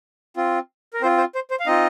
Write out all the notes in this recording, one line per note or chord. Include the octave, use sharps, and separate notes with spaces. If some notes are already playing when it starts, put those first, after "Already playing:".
C4 F4
A#4
C4 F4 C5
C5
C5
C5
F5
C4 D#4 F4 D#5